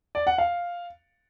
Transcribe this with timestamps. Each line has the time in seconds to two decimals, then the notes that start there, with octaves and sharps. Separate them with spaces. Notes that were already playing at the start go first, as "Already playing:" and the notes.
0.15 D5
0.27 F#5
0.38 F5